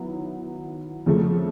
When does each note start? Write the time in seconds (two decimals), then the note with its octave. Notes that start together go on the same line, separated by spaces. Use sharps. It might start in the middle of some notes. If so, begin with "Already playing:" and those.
Already playing: D#3 F#3 B3 E4
1.06 F2 C#3 F3 A3